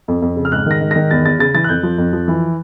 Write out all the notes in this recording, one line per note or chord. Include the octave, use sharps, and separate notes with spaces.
F2
F2
C#3
F6
G#2 F#6
D#3 A#6
G#2
A#6
D#3
E2 A6
E2 A6
C#3 A6
E3 A6
F#6
F2 G6
F3
F2
F3
E3